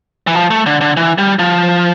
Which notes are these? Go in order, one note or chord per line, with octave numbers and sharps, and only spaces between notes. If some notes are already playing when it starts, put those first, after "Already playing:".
E3
F3
A3
D3
D3
E3
G3
F3